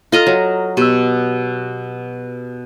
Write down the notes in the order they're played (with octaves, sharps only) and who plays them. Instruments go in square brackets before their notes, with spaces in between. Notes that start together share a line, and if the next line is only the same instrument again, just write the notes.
[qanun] F4 D#5 A#5 [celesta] A4 F6
[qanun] F#3
[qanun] B2 [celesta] G4 E6